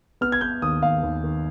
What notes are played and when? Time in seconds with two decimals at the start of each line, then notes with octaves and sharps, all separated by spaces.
0.21 B3 F6
0.32 G#6
0.41 B3 G6
0.62 D#2 D#6
0.82 D#2 F5
1.03 D#2
1.24 D#3